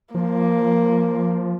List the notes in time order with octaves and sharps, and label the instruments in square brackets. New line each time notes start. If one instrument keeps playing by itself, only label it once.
[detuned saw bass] F3 [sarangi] A#3